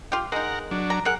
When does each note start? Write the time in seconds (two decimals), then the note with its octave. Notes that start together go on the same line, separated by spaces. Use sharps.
0.12 F4 G4
0.32 G#3 D#4 A#4 F#5
0.71 F#3 D4
0.90 A#5
1.05 G#4 A#4 F#5